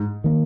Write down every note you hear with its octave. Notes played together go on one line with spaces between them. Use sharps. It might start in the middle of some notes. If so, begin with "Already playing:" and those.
Already playing: G#2
D#3 A#3